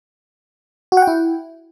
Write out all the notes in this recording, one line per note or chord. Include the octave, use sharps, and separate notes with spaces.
F#4
F#5
G5
E4